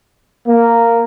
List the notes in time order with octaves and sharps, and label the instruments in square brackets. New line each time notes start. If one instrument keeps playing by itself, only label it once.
[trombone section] A#3